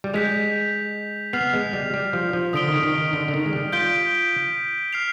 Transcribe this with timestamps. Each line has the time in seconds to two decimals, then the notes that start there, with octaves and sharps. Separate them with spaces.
0.04 G3
0.14 G#3 G6 B6 F7
1.33 B3 F6 C7 F7
1.53 G#3
1.73 G3
1.94 G3
2.13 F3
2.33 F3
2.53 D3 D#6 B6 D7 G7
2.68 D#3
2.83 D#3
2.98 D#3
3.13 D3
3.28 D3
3.34 D#3
3.46 G#3
3.53 G3
3.73 F4 G6 B6 D7 G7
4.93 F6 C7 F7